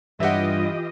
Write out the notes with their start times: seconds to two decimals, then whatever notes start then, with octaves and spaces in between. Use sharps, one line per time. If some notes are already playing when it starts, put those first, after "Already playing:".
0.20 G2 E3 F4 G4 D#5 E5 F#5